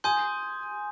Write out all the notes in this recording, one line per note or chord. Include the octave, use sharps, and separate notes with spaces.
G#5 C6 D#6 G6